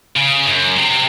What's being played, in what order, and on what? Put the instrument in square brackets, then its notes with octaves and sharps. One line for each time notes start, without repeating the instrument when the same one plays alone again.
[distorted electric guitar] C#3
F#2
C3